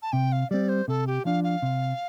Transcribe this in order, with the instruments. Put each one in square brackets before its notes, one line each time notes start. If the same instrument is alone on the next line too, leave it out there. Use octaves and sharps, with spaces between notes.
[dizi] A5
[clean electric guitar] C3 [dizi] G5
[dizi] F5
[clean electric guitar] G3 C4 [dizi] D5
[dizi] C5
[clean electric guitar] C3 [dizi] A4
[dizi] G4
[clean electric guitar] F3 D4 [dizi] F5
[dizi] F5
[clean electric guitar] C3